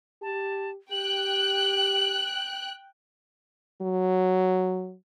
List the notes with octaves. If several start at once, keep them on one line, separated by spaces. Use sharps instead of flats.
G4 A5
G4 G5 F#6 F#7
F#3